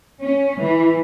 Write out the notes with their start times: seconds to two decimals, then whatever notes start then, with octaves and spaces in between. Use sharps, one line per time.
0.20 C#4
0.59 E3